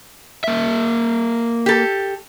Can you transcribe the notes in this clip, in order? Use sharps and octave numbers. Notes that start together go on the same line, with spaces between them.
A#3 E5
G4 A4